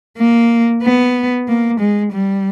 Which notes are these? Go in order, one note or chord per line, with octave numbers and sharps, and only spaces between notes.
A#3
B3
A#3
G#3
G3